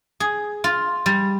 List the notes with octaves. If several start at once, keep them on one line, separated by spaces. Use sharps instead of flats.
G#4
F4
G3